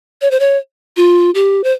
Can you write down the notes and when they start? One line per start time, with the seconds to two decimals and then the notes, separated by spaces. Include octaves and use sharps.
0.22 C#5
0.31 C5
0.40 C#5
0.97 F4
1.35 G4
1.64 C5